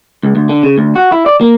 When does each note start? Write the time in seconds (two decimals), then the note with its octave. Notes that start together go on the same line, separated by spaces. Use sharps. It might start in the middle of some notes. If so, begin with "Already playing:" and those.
0.23 C#2
0.36 D2
0.49 D3
0.63 C#3
0.78 D2
0.95 F#4
1.12 E4
1.26 D5
1.41 A#3